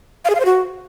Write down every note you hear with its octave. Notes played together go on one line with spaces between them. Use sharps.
F5
G#4
F5
C5
F#4